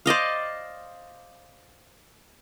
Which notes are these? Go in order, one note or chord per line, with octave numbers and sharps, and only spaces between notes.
C5 D5 D#5 F5